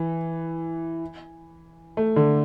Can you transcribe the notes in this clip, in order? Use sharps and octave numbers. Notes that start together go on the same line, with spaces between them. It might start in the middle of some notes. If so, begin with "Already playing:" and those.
Already playing: E3
A3
D3